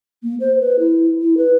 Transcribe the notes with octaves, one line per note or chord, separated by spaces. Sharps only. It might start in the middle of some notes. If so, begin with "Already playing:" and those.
A#3
C5
B4
E4
E4
B4